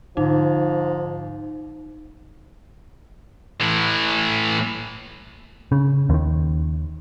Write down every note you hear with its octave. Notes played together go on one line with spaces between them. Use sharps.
G#2 D3 F3 D#4
A2 E3
C#3
D#2 D#3